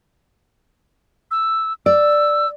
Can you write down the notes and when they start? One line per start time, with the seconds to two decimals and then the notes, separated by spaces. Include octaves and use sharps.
1.31 E6
1.86 D5 E6